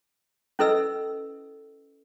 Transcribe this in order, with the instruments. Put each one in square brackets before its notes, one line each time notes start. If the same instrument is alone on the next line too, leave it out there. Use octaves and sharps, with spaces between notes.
[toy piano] C#4 E4 A4 B4 D#5 E6